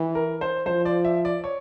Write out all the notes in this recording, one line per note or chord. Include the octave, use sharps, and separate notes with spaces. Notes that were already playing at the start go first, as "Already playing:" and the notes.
Already playing: E3
A#4
C5
F3 C5
D5
E5
D5
C#5